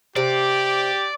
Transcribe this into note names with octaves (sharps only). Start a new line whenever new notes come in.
C3 G4 D5